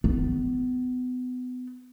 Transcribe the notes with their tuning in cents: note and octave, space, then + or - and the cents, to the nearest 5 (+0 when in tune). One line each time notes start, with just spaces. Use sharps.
B3 +30